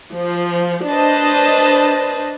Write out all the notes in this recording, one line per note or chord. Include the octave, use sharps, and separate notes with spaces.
F3
D4 B4 C5 D#5 A5